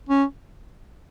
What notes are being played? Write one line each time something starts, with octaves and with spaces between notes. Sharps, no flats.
C#4